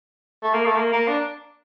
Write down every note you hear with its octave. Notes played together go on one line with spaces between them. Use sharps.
A3
A#3
A3
A#3
A#3
D4